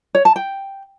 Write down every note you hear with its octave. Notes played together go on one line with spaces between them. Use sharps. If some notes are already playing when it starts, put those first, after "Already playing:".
C#5
A5
G5